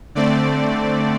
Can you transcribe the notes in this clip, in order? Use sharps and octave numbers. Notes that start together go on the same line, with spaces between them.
D3 A3 C4 D5